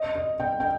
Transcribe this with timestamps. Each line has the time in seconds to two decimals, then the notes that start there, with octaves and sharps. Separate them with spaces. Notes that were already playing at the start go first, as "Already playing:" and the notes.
Already playing: D#5
0.15 D#5
0.40 G5
0.60 G5